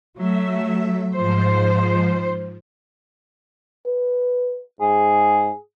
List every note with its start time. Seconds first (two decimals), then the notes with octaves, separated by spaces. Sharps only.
0.18 F#3 A3 E5
1.15 G#2 F3 C5
3.86 B4
4.81 G#2 G#4